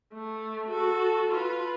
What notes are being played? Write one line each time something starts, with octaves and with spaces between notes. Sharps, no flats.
A3
F#4 A4
F4 B4